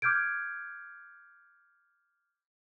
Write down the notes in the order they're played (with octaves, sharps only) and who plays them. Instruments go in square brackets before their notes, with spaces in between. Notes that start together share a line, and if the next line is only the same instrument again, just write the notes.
[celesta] D6 F6 G6 G#6 D7